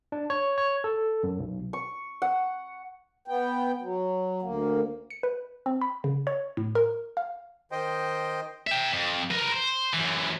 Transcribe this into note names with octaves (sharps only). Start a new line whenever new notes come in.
D4
C#5
C#5
A4
F#2
B1
C#6
F#5
B3 G5
F#3
D2 A#3
C#7
B4
C4
B5
C#3
C#5
A2
A#4
F5
D#3 C5 D#5 G5
E5 G5
F2
A#4 B4
C5
F#2 E3